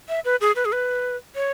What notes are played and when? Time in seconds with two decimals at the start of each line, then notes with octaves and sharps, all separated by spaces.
0.09 E5
0.25 B4
0.41 G#4
0.56 B4
0.65 G#4
0.72 B4
1.36 C#5